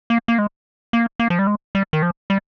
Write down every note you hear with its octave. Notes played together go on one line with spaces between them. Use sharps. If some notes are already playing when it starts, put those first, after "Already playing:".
A#3
A#3
G#3
A#3
A#3
F3
G3
G#3
G3
D#3
F3
G3